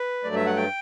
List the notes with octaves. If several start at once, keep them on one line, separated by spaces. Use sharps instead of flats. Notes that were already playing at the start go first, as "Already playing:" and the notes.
Already playing: B4
G2 F#3 A3 D5
E5
F#5
G5